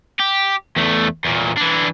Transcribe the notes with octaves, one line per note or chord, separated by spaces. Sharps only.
G4
E2 A3
E2 A#2
E3 D4